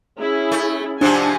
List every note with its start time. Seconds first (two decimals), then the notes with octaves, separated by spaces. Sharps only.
0.21 C#4 E4 G#4
0.52 A3
1.01 G#2 C3 F3 D4 G#5